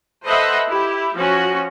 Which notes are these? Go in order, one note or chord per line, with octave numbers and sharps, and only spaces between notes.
A4 B4 C5 D#5 E5 F#5
E4 G4
F3 C#4 F#4